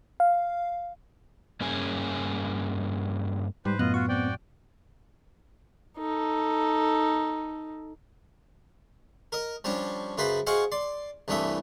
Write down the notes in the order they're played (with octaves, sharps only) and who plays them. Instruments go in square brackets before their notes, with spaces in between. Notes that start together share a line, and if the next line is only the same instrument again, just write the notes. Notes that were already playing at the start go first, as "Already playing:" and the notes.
[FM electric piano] F5
[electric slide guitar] G2 A#3 C#4 G#4 G#5
[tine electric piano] G#2 [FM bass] G3 [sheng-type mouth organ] B4 C5
[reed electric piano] F#2 A2 [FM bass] B3 [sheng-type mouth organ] F4 D#5 [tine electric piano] F#6
[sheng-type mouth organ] F4 F#4 [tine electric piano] C#6
[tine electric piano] C4 [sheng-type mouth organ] F#4 D5 G5
[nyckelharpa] D#4 A4
[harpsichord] A#4 D#5
F3 G3 C#4 D4
F#2 C#3 B4 C5 B5 C6
F#4 G#4 C5 D#5 F5 F#5
D5 C6
C2 G2 E3 A3 E5 D#6